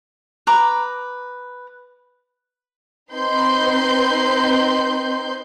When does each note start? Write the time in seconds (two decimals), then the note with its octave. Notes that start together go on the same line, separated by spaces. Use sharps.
0.47 B4 A#5 D6
3.12 C4 D#4 B4 C6 G6